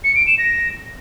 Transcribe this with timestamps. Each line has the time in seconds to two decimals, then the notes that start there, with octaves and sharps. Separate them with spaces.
0.04 C#7
0.15 D7
0.27 E7
0.38 A#6